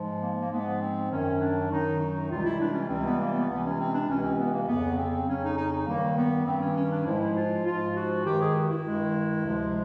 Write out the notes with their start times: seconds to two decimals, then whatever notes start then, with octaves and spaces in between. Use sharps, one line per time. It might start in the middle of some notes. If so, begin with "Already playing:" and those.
Already playing: G#2 F3 G#3
0.21 A#3
0.40 A#3
0.50 G#2 F3 G#3 B3
0.80 C4
1.09 F#2 D#3 F#3 C#4
1.39 D4
1.69 F#2 D#3 F#3 D#4
1.99 D#4
2.28 C#2 C3 E3 G3 F4
2.44 E4
2.59 D4
2.74 C#4
2.88 C#2 C3 E3 G3 C4
3.04 B3
3.19 A#3
3.33 B3
3.47 C#2 C3 E3 B3
3.63 C#4
3.78 C4
3.93 D4
4.07 C#2 C3 E3 C#4
4.22 C4
4.37 B3
4.53 A#3
4.67 F2 C#3 F#3 B3
4.97 C4
5.27 F2 C#3 F#3 C#4
5.42 D#4
5.56 D#4
5.71 D#4
5.86 G2 D#3 G3 A#3
6.16 B3
6.45 G2 D#3 G3 C4
6.60 C#4
6.76 C#4
6.91 D4
7.05 G#2 F3 G#3 E4
7.35 F4
7.64 G#2 F3 G#3 F4
7.94 F#4
8.24 G2 D#3 G#3 G4
8.39 G#4
8.54 F#4
8.69 E4
8.84 G2 D#3 G#3
9.43 D2 C3 F3 G#3